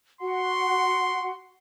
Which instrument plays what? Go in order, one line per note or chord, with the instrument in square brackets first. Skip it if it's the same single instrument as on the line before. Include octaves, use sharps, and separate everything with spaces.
[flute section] F#4 F#5 [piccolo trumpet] C6